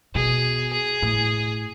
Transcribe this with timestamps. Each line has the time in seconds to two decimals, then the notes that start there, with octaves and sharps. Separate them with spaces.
0.15 B2 G#4
0.73 G#4
1.02 A2